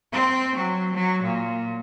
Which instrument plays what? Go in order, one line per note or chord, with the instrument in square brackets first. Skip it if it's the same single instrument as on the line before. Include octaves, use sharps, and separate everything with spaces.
[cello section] C4
F#3
F#3
A#2